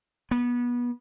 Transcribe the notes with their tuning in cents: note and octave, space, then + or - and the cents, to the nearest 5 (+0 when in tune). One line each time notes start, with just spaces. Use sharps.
B3 -25